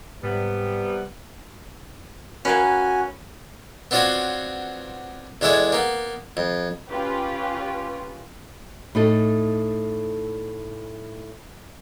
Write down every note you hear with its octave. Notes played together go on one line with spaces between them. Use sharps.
G#2 C3 G3 B3
A#3 C#4 F#4 A#4 B4 G#5
B3 C4 D4 F4 F#4 C#5
E2 G#3 D4 E4 A4 C#5
A#3 B3
F2
C#4 F4 G4 B4
A2 D#4 A4